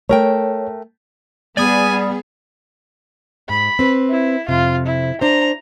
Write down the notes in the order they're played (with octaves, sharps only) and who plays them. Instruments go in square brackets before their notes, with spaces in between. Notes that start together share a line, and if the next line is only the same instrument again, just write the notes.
[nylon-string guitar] A3 A#4 G5 [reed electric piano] C#5
[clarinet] G3 [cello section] B3 G#4 [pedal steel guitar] D5 D#6 [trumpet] G#5
[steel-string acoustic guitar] G#2 [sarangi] B5
[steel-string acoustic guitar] C4 B4
[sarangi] E4
[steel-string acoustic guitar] F2 C3 [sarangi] F4
[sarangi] E4
[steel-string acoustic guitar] D4 C5 [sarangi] A#5